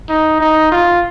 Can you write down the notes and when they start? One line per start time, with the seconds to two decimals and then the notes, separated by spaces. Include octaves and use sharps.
0.09 D#4
0.40 D#4
0.72 F4